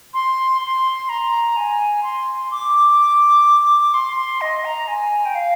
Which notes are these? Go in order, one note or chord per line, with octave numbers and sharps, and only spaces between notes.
C6
C6
A#5
G#5
C6
D6
C6
C6
D#5
A#5
G#5
G5
F5